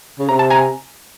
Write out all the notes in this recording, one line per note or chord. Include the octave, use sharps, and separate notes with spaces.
C#3
C3 A#5
A5
G#5 A#5